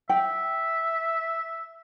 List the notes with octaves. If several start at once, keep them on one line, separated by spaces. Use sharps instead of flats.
E5 G5